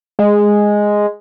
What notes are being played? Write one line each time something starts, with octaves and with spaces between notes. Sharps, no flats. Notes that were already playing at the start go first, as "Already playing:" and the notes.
G#3